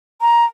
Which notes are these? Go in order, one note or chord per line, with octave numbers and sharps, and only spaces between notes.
A#5